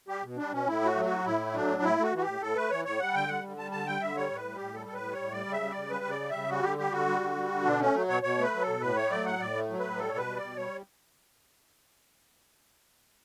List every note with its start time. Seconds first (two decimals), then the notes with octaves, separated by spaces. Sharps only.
0.08 G3 G4
0.23 B2
0.37 G3 D4
0.52 B2 C#4
0.66 A2 E4
0.81 A3 F#4
0.95 F#3
1.05 F#4
1.11 A2
1.25 A2 E4
1.40 A3
1.54 F#3 D4
1.68 A2
1.83 A2 E4
1.98 A3 F#4
2.13 E3 F#4
2.21 G4
2.26 A2
2.41 A2 A4
2.56 A3 B4
2.70 E3 C#5
2.85 A2 C#5
3.00 G3 F#5
3.14 D3 G5
3.28 G3 F#5
3.44 D3
3.57 G3 A5
3.72 D3 A5
3.87 G3 G5
4.01 D3 E5
4.15 G3 C#5
4.30 A2
4.36 B4
4.44 G3
4.55 G4
4.60 A2
4.74 G3 A4
4.87 A2 A4
4.93 B4
5.03 G3
5.12 A2 C#5
5.32 G3 D5
5.47 C#3
5.52 E5
5.61 G3
5.71 D5
5.76 C#3
5.90 G3 B4
6.05 C#3
6.10 D5
6.20 G3
6.30 C#3 E5
6.49 G3 F#4
6.63 D3 G4
6.78 G3 G4
6.92 D3 F#4
7.06 G3
7.21 D3
7.36 G3
7.51 D3
7.65 B2 D4
7.80 A3 C#4
7.95 F#3
8.09 B2 C#5
8.23 B2 C#5
8.38 A3 B4
8.53 F#3
8.62 A4
8.68 B2
8.81 A2 B4
8.96 A3 C#5
9.10 F#3 D5
9.25 A2 F#5
9.39 A2 D5
9.54 A3
9.70 F#3
9.79 A2 B4
9.98 G3 A4
10.08 C#5
10.12 B2 B4
10.27 G3
10.36 D5
10.42 B2
10.56 G3 C#5